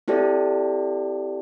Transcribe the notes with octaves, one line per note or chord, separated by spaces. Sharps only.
C4 E4 G4 A4 D5